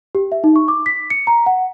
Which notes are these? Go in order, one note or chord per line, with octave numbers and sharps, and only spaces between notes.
G4
E5
D#4
C#6
D6
B6
C#7
A#5
F#5